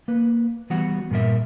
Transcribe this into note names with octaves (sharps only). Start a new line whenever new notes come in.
A#3 B4
E3 G3 B3 F#4 F#5
G2 A#2 F#4 A#4 E5